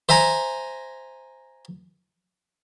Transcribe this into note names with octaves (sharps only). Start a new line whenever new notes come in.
C5 E5 G#5 A#5